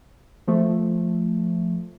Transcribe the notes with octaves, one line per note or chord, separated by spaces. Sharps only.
F3 A3